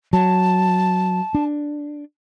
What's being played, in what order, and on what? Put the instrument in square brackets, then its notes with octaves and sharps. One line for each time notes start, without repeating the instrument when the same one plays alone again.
[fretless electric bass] F#3 [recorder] A5
[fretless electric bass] D4